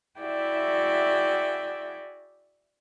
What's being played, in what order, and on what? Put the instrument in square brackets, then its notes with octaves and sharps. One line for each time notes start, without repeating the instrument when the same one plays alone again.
[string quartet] E4 F#4 G#4 D5 E5 G5